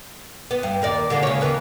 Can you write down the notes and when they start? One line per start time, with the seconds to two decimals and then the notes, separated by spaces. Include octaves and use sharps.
0.51 B3
0.63 G2
0.82 D#2 A#4 D5
1.10 D3 G#3 A#3
1.23 C#3 C#5
1.41 D#2 A#3 B3